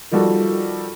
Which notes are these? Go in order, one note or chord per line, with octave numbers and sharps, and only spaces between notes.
D#3 F3 G3 F#4 A4